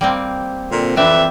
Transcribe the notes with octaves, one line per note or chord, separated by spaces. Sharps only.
G3 A#3 C4
A#2 D3 C4
F2 E3 C4 D4 B4 E5